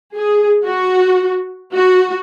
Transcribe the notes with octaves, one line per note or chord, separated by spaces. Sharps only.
G#4
F#4
F#4